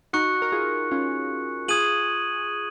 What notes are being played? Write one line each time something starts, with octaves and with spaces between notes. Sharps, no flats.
D#4 F#4 C#6 F#6 C#7
A#4
F4 G#4
C#4 F4
F4 G#4 D#6 G#6 D#7 F#7